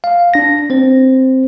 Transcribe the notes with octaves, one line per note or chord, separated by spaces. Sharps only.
F5
D4 A#6
C4 C5